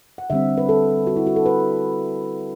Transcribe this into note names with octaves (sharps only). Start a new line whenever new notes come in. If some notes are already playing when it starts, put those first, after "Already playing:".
F#5
D3 G3 C4 E5
B4
A4
F#4
E4
F#4
A4
B4